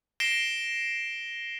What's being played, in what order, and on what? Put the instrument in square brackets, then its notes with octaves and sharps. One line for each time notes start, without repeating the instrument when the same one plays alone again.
[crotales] A#6 C7 D7 E7 G7